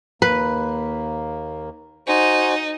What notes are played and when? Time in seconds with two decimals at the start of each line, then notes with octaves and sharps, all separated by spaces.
0.22 D#2 A#3 B4
2.08 D#4 F#4 C5 G#5